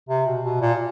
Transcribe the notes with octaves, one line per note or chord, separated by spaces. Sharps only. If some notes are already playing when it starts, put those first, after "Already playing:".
C3
B2
B2
A#2